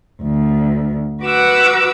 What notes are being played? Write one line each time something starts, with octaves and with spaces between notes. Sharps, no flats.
D2
F#4 B4 F#5 D6 E6